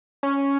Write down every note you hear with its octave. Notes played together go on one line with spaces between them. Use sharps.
C#4